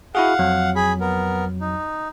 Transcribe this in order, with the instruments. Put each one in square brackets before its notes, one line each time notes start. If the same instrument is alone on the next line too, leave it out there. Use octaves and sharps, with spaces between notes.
[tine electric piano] E4 F#4 G#4 [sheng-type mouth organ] F5 F#5
[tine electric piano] F2 F#3
[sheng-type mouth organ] G#4 B5
B3 A#4
D#4